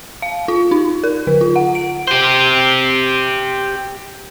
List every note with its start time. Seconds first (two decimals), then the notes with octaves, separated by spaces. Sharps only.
0.22 F5
0.48 F4
0.71 D#4
1.04 A#4
1.27 D3
1.41 F4
1.56 F#5
1.75 D7
2.08 G4 C5